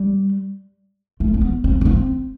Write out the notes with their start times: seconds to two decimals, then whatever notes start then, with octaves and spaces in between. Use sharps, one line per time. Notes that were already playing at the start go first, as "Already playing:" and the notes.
Already playing: G3
1.20 A3
1.34 C4
1.41 B3
1.64 C4
1.81 D4
1.85 C4